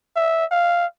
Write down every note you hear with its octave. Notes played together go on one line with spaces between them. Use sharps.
E5
F5